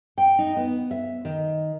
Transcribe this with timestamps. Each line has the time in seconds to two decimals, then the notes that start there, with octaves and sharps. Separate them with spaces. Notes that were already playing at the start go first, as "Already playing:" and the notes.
0.18 G5
0.39 D#4
0.56 B3
0.91 E5
1.25 D#3